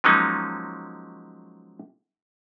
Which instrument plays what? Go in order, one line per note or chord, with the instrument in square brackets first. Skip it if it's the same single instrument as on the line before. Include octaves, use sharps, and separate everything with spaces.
[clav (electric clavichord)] F3 F#3 G#3 A#3 C#4 D#4